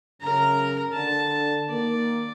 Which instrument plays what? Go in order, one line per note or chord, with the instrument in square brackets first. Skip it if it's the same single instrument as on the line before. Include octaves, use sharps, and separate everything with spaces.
[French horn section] F#2 C#3 [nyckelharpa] A#4 A#5
[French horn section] D3 [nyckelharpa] A5
[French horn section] D#3 A#3 [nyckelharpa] D5